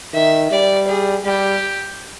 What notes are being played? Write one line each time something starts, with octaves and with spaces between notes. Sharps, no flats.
D#3 E5
G3 D5
G#4
G3 G4